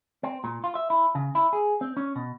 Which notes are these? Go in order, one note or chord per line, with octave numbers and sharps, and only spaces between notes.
C4
A#2
F4
E5
E4
C#3
E4
G#4
C4
C#4
B2